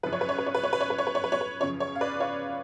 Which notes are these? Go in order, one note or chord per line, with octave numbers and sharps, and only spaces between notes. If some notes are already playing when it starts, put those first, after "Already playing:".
F#2 C#3 F3 B4
C#5
B4
C#5
B4
C#5
B4
C#5
B4
C#5
B4
C#5
B4
C#5
B4
C#5
B4
F#2 C#3 F3 C#5
C#5
F5
B4 D5
C#5 F5